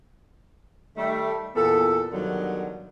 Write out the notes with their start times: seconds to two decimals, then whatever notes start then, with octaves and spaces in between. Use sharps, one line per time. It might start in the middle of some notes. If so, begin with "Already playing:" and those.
0.97 D#3 G3 A3
1.55 E2 A#2 B3 A4
2.12 G2 B2 D3 D#3 F#3